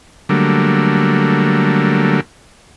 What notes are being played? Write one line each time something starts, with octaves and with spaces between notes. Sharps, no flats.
D3 F#3 G3 A3 A#3